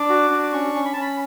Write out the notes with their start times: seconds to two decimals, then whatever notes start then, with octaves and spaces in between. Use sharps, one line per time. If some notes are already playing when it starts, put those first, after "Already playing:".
Already playing: D4 D6
0.09 F#4
0.31 D4
0.43 D6
0.52 C#4 C#6
0.75 C#4
0.85 B5
0.93 A5
0.96 C#4 B5